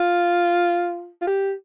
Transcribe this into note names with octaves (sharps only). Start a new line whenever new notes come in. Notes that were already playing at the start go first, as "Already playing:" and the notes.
Already playing: F4
F4
G4